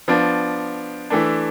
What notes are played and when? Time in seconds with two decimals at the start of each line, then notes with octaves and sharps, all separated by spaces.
0.08 F3 B3 D4
1.10 E3 A3 D4